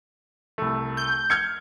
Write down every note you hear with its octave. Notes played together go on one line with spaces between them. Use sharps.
C2 A3
G6
F6 G#6 C#7